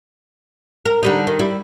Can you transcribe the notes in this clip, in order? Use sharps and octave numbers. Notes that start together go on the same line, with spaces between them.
A#4
D3 G3 D#4
D#3
G3 E4